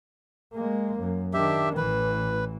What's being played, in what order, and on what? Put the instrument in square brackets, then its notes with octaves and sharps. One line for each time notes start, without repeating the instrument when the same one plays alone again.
[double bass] G#3 A#3
F#2
[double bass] D#3 D4 [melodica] G4 E5
[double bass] A1 E3 [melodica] B4